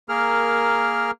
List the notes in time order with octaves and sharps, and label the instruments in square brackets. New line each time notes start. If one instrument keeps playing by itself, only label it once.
[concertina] A#3 G#4 A#4 F6